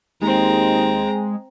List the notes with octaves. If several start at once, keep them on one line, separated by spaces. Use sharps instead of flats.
D#2 G#3 C4 A#5